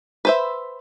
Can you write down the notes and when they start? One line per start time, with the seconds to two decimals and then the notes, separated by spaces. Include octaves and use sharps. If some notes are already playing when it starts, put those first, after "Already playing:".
0.25 B4 C5 E5